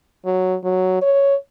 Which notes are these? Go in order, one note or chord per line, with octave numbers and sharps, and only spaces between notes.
F#3
F#3
C#5